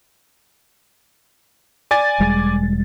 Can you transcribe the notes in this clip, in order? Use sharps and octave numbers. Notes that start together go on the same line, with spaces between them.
D5 G#5 A6
E1 G3 G#3